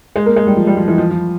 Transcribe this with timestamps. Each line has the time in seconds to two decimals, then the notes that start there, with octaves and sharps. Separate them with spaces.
0.16 G#3
0.26 A#3
0.36 G#3
0.47 G3
0.57 F3
0.67 G3
0.77 F3
0.88 E3
0.98 F3
1.11 F3